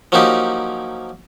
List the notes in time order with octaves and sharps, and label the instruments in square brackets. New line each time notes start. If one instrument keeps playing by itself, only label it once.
[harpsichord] F3 F#3 A#3 C#4 D#4 G4